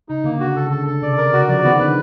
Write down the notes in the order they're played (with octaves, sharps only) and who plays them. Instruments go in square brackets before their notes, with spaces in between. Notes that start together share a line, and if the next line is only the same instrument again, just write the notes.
[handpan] C#3 [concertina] D#4
[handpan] D3 [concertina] A#3
[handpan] C#3 [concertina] F#4
[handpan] C#3 [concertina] A4
[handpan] D3 [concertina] A4
[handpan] C#3 [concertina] A4
[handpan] C3 [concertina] D5
[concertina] A#4
[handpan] C#3 [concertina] F#4
[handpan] F3 [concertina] D5
[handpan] D#3 [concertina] B3
[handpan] D3 [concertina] B4